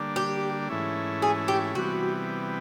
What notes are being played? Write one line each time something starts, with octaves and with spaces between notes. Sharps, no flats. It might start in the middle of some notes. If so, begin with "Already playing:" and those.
Already playing: D3 G3 A#3 D4
G4
G#2 E3 A3 C#4 E4
G#4
G4
C3 E3 G3 B3 F#4